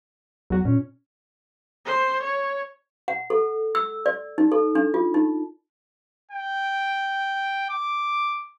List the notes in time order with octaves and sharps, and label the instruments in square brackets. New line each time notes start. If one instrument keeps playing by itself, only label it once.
[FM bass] E2 [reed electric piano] F#3 F#4
[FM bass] A#2 [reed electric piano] C#4
[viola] C5
C#5
[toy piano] F#5
A4
E6
D5
D#4
A4
D4
F4
D#4
[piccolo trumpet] G5
D6